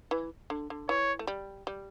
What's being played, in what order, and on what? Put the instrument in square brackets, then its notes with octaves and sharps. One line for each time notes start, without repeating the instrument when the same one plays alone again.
[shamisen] E3
D3
D3
[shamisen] E3 [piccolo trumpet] C#5
[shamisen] A3
G3
G3